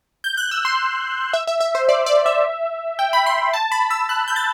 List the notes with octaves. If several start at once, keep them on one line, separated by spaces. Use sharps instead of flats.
G6
F#6
E6
C6
E5
E5
E5
C5
D5
D5
E5
G5
B5
C6
A5
B5
E6
F#6
G6
A6